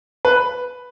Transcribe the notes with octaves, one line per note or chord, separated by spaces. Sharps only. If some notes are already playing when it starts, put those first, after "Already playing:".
B4